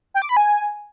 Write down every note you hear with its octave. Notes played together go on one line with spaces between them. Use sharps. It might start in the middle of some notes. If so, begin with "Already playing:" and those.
G5
D6
B5
G#5